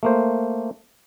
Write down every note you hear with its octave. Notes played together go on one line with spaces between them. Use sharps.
A3 A#3 C5